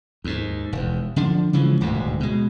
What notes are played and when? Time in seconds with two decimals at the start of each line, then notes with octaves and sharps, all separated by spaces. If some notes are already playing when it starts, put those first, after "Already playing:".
0.24 D#2 G#2
0.73 E1 D#2
1.16 D3 F3 D4
1.53 C#3 E3 F3 G#3
1.81 D#1 D2 G#2 B2
2.20 B2 G#3